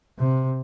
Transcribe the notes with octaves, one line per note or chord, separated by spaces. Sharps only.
C3